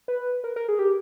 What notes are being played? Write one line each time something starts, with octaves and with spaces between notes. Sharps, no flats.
B4
A#4
A#4
G#4
G4